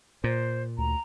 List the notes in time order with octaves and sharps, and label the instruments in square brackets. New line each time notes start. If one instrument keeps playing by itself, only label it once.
[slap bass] A#2 [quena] C5
[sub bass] D2 [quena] A#5